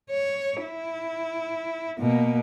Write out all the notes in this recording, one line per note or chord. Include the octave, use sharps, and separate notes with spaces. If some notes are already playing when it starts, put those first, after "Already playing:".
C#5
E4
B2 A#3